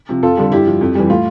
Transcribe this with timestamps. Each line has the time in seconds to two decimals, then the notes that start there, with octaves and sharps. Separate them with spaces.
0.09 C3 F3
0.23 F2 F4 A4
0.37 D3 G3
0.52 G2 E4 G4
0.67 F3
0.81 F2
0.95 E3 G3
1.10 A2 F4